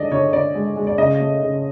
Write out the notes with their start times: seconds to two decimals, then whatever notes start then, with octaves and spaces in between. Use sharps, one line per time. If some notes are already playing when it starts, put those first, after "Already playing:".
Already playing: D3 G#3 D5 D#5
0.12 D3 C#5
0.33 D3 D5
0.55 G#3
0.76 G#3
0.87 D5
0.98 C#3 D#5
1.20 A3
1.41 C#3